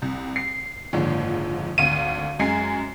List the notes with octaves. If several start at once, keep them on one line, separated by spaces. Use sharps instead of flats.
C2
C7
F#1 G#2 D3 F3
G#1 D2 F5 D#7
F#2 G#3 G#5 C7